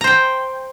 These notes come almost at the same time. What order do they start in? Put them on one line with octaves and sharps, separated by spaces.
A#5 C5 G5